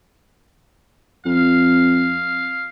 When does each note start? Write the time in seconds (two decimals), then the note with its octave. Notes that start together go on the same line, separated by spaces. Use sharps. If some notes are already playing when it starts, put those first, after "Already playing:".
1.26 F2 F5